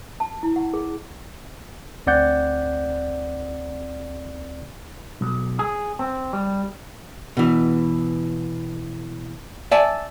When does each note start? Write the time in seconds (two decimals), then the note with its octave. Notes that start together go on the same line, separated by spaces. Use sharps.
0.20 A5
0.43 E4
0.56 F#5
0.74 G#4
2.07 D2 C4 D5 F#5 G6
5.21 B1
5.59 G#4
5.99 C4
6.33 G3
7.37 B2 E3
9.72 D5 E5 G#5 A5